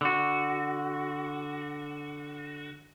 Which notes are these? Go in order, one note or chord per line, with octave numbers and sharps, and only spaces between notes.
D3 F#4